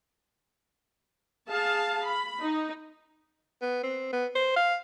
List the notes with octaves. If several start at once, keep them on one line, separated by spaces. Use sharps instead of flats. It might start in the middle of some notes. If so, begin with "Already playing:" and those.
G#4 F5 A5
B5
D#4
B3
C4
B3
C5
F5